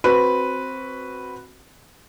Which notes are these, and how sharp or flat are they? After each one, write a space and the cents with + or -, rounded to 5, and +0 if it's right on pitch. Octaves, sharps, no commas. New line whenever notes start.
C4 +10 F#4 +0 B4 +0